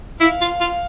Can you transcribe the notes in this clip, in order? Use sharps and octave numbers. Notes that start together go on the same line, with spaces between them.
E4 F5
F4
F4